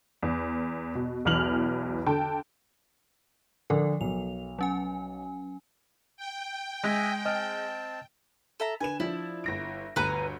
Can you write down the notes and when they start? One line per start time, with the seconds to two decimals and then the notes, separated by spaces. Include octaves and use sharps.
0.23 E2
0.95 B2
1.25 B1 E2 E3 F6 F7 F#7
2.06 D3 G5 A5
3.70 D3 F3 A4 A#4
4.01 B1 F7
4.59 F#3 C#4 G#5
6.17 G5
6.84 G#3 D#5 E5 G#5
7.26 C4 D#5 A5 F6
8.60 A4 E5 A#5
8.81 D3 B4 G#5 E7
9.00 F3 D4 E4
9.44 G1 A#6 D7
9.96 G1 D2 B4 G#5 A#5